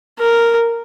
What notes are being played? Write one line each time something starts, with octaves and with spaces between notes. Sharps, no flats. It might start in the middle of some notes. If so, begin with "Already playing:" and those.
A#4